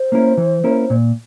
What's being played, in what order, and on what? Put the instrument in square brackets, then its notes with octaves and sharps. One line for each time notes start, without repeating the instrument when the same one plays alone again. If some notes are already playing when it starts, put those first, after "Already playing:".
Already playing: [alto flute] C5
[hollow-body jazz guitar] A#3 C#4 E4 A#4
E3
A#3 C#4 E4 A#4
A#2